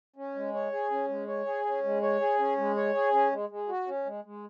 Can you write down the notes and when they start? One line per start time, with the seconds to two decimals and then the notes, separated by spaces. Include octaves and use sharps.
0.16 C#4
0.35 G#3
0.54 C#5
0.72 G#4
0.91 C#4
1.08 G#3
1.27 C#5
1.46 G#4
1.65 C#4
1.84 G#3
2.02 C#5
2.20 G#4
2.39 C#4
2.57 G#3
2.76 C#5
2.94 G#4
3.13 C#4
3.31 G#3
3.49 G#3
3.68 F#4
3.87 C#4
4.05 G#3
4.24 G#3